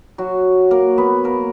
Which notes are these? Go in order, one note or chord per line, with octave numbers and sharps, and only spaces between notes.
F#3 F#4
A#3 A#4
B3 B4
A#3 A#4